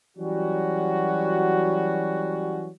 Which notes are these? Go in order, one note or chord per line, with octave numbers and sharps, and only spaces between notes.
E3 F#3 G3 C#4 F#4